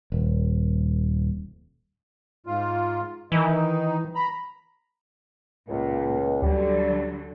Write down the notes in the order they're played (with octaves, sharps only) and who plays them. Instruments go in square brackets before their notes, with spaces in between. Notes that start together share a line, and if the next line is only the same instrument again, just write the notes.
[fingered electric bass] D#1
[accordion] G#2 F4
[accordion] D#3 D#4 [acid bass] E3
[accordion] A#5 B5
[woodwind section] C#2 [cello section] A#2
[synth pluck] D2 [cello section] D3 F#3 [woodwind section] G3